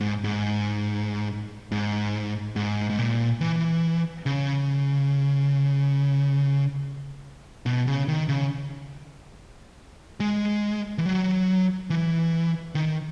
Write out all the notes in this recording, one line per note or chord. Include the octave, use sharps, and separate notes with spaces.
G#2
G#2
G#2
G#2
G#2
A#2
E3
C#3
B2
C#3
D#3
C#3
G#3
E3
F#3
E3
D#3